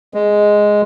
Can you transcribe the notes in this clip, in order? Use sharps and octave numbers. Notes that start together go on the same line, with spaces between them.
G#3